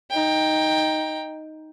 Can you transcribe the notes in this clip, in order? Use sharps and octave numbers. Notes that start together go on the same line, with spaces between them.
D#4 G5